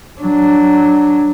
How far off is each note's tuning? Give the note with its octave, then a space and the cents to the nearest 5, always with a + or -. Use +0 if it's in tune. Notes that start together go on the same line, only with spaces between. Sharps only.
F#3 +0 D4 +0